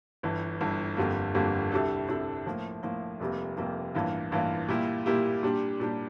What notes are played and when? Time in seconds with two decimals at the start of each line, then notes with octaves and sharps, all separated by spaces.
0.23 G1 G2 E3
0.61 G1 G2 E3
0.97 G1 F2 D3 G3 A#3
1.34 G1 F2 D3 G3 A#3
1.72 C2 C3 G3 D4 A4
2.09 C2 C3 G3 D4 A4
2.46 A2 F3 A#3
2.83 A2 F3 A#3
3.20 F1 F2 C3 G3 A#3
3.57 F1 F2 C3 G3 A#3
3.95 A1 G2 E3 A#3 F4
4.32 A1 G2 E3 A#3 F4
4.69 A#2 G3 A#3 E4 G4
5.06 A#2 G3 A#3 E4 G4
5.43 A#2 G3 D4 G4
5.80 A#2 G3 D4 G4